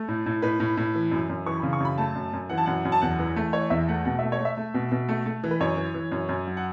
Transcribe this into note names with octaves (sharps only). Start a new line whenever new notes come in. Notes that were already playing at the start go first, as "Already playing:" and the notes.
Already playing: A3
A2
A2
A2 B4
A2
A2
E3
F#2
F#2
E3 C#6
C#3 B5
C#6
F#2 B5
A3 A5
F#2
F#2
E3 F#5
A5
F#2 F#5
F#2
A5
E2 F#5
E3
A3
E3 C#5
E2 E5
A3 F#5
B2 F#5
A3 E5
C#5
A3
E5
A3
B2
B2
A3
A3
E3
B4
F#2 C#5
E3
E3
F#2
F#2
F#3
F#5